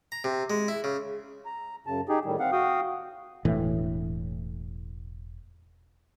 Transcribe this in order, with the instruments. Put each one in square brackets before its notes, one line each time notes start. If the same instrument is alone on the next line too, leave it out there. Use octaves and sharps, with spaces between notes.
[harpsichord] A#5
C3
G#3
E4
C#3
[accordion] A#5
F#2 C#3 A5
D#4 G4 G#4
A2 D#3 G3
C4 F5 F#5
F#4 F5 G5 D#6
[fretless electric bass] E1 A2 E3